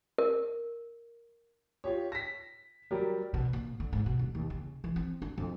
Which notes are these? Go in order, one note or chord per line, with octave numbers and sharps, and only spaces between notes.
A#4
F4 G4 C#5
A#6 B6
F#3 G3 G4 A#4 D5
B2
A#2
D3
G#2
B2
D#1
D#2
C#3
E3
C4
D4
F2